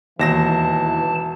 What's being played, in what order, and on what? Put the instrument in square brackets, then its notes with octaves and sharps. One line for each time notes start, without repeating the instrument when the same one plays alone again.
[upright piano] E1 A#6 E7 [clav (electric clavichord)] D#2 [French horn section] E3 [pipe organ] A5